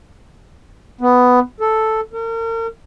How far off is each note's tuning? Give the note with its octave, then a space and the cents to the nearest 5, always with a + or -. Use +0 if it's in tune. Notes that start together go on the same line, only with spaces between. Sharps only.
B3 +10
A4 +0
A#4 -40